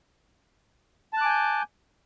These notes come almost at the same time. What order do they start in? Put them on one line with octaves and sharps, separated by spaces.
A5 F#6 D6 G#5 G6